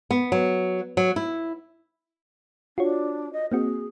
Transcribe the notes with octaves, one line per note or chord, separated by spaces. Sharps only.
B3
F#3
F#3
E4
D4 F4 F#4 C#5
D#5
A#3 C4 F#4 G#4